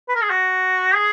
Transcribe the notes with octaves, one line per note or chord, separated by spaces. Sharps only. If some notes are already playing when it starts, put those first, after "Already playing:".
B4
A#4
G#4
F#4
G#4